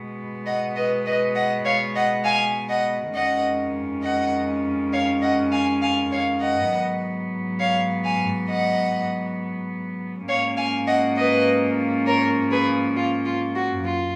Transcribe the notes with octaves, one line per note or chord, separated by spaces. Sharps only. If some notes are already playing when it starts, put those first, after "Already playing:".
Already playing: B2 G#3 B3
D#5 F#5
B4 D#5
B4 D#5
D#5 F#5
C#5 F5
D#5 F#5
F5 G#5
D#5 F#5
F2 D#3 G#3 C#4 D#5 F#5
D#5 F#5
C#5 F5
D#5 F#5
F5 G#5
F5 G#5
C#5 F5
D#5 F#5
G#2 F#3 B3
C#5 F5
F5 G#5
D#5 F#5
G#2 F3 A#3 C#4 C#5 F5
F5 G#5
D#5 F#5
B4 D#5
A#4 C#5
G#4 B4
F4
F4
F#4
F#2 F4